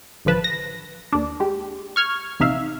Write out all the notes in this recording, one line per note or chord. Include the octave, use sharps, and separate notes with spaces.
A1 D3 F3 B4 A5
A#6
D#2 D4
G#3 G4
C#6 F6 G#6
A#1 C3 D#4 E5 F5